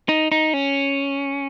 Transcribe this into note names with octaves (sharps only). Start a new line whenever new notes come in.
D#4
D#4
C#4